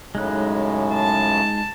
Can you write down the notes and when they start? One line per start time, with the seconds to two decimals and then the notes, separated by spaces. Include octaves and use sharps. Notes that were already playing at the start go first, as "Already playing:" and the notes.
0.15 F#2 A2 C#3 G#3 D#4 F#6
0.93 A5